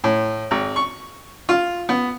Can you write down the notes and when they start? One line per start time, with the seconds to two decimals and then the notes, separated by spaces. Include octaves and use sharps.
0.04 A2
0.51 G#1
0.76 C#6
1.49 F4
1.89 B3